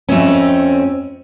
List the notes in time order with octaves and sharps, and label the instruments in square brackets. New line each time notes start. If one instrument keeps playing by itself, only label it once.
[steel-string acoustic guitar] F2 A3 C4 C#4